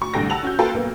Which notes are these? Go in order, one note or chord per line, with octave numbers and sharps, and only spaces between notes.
D2 C#6
C2 A2 D3 A4 G5 A#6
F#5 A5 E6 F7 F#7
C#4 F#4 G6
A#3 F4 F#4 A4 B4 G5
B1 A#3 B3